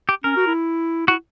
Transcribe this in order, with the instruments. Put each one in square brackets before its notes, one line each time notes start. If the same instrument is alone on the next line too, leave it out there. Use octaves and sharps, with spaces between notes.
[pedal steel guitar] G4
[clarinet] C#4 [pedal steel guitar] A#4
[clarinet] F#4
E4
[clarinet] E4 [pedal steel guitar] F#4